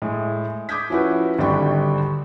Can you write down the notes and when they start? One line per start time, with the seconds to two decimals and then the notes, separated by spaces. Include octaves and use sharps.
0.02 A2 G#3
0.69 D6 D#6 G6 G#6 B6
0.90 F3 C#4 E4 F#4 B4
1.39 G#1 D3 G3 D4 G5 C#6